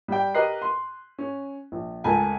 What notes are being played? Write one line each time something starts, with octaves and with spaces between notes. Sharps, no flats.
G3 G5
G4 A#4 B4 D#5 F#6 C7
C6
C#4
A#1
C#2 A3 A#4 G#5 A5 B5